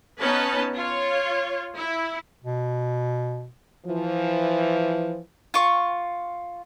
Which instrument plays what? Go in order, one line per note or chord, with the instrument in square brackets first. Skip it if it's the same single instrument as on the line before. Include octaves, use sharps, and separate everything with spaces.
[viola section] B3 C#4 D#4 B4 A5
F4 C#5
E4
[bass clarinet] B2
[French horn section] E3 F3
[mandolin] F4 C#6